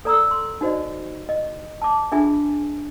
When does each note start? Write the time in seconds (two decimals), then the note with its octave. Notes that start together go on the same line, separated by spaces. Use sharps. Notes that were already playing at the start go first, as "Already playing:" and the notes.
0.05 A4 D5 A#5 D#6 E6
0.31 C6
0.61 D#4 F#4 C5 D5 D#5
1.29 D#5
1.82 A5 D6
2.12 D4 F4 G#4 E5 G#5